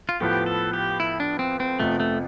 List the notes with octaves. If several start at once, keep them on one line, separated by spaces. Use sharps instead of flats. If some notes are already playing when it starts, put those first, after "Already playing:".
F4
A2 F3 B3 F4 G4 B4
A4
G4
E4
D4
C4
C4
F2 C3 F3 A3 B3 F4
A3